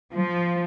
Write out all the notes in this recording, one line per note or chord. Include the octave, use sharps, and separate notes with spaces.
F3